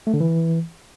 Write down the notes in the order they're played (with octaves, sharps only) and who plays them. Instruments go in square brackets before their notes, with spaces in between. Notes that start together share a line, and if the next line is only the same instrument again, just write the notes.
[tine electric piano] A3
D3
E3